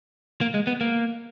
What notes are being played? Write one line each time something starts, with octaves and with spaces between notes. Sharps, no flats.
A#3
G#3
B3
A#3